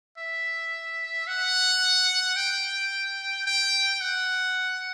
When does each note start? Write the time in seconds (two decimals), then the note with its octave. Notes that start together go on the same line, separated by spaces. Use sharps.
0.18 E5
1.27 F#5
2.36 G5
3.46 G5
4.01 F#5